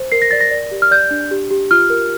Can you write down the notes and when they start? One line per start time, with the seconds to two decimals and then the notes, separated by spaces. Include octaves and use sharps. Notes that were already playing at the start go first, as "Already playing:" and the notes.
Already playing: C5
0.12 A#4 C7
0.22 A#6
0.31 D5 A6
0.41 A#6
0.51 D5
0.71 G4
0.82 F6
0.91 D5 G6
1.11 D4
1.31 G4
1.51 G4
1.71 F4 F6
1.90 A#4